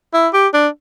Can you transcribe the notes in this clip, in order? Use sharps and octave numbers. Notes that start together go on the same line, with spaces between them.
E4
G4
D4